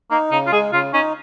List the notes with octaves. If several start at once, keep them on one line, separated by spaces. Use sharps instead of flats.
A#3 D#4
C#3 D#4
F4
G#3 G#4
C#3 F4
C#4 D#4